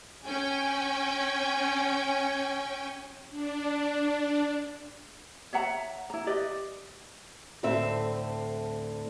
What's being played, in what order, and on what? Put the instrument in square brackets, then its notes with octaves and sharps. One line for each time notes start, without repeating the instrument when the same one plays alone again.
[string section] C#4 G5 G#5
[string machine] D4
[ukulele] C#5 E5 F#5 A#5
E4 A#5
G4 B4 D5 D#5
[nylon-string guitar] D2 A2 C4 A4 E5